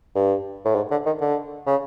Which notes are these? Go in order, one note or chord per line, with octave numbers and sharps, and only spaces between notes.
G2
A2
G#2
D3
D#3
D3
C#3